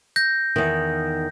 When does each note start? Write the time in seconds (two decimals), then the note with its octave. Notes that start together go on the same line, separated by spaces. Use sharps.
0.16 G6 A#6
0.56 E2 D#3